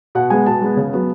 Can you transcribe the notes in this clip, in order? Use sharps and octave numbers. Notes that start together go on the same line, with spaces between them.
B2 F#5
G#3 B3 G#5
B2 A5
G#3 B3
C#3
F#3 B3